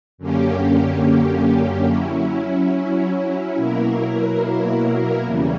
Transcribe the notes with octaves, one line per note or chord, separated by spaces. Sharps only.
F#2 D3 A#3 C#4 G4
F#3 C#4 E4
B2 F#3 A#3 E4 A#4
E2 C#3 E3 G3 C#4